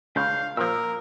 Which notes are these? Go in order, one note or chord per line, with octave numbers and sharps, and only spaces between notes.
C#2 C#3 D4 F5 G6
A#2 F3 A#4 E6